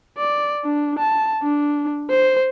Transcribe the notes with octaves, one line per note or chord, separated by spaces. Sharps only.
D5
D4
A5
D4
C5